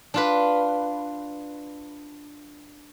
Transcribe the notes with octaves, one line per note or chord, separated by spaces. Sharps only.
D4 F4 B4